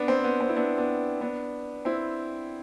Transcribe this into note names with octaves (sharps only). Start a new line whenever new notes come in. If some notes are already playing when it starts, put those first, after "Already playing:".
Already playing: B3 D4
C4
B3
C4
E4
B3 D4
B3 D4
B3 D4
C4 E4